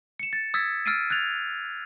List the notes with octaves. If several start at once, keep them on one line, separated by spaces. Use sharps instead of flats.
C#7 E7
A6
D#6 E6 G#6 A6 B6
E6 F6 A6 C7 D7 D#7
F#6 G#6 A6 F7